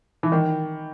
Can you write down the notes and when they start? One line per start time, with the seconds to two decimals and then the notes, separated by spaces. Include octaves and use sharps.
0.23 E3
0.32 D#3